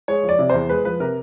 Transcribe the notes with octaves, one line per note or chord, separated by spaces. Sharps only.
G#3 C#5
F3
D5
C3
E2 C5
G#3 B4
F3 B4
C3 A#4